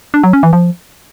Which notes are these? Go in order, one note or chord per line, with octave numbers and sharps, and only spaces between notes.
D4
F#3
C#4
E3
F3